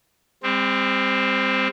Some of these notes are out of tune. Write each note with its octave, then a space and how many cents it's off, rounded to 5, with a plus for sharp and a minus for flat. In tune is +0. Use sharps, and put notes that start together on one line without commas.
G3 +45 C4 +0